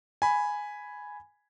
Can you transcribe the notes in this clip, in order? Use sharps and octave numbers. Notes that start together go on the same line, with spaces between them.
G#5 B5